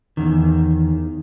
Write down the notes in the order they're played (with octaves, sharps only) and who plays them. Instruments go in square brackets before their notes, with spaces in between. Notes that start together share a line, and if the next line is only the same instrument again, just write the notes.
[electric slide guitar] E2 D#3